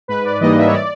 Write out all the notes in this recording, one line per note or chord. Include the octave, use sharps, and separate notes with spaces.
G#2 B4
D5
E3 G3 A#3 D#4 D#5
E5
C#5
D5